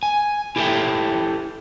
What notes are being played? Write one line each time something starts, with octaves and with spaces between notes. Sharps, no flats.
G#5
E4 G4 A4 C#5 E5 G5